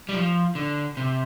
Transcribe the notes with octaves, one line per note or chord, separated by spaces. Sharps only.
G3
F3
D3
C3